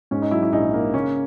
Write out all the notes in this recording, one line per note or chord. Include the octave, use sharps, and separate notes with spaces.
G#2 C#4
D#4
F#3 E4
E4
A#1 D#4
A#3
C#3 C#4